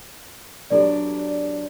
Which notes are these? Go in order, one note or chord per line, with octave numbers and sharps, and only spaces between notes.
E2 F#3 D4 G4 A4 D5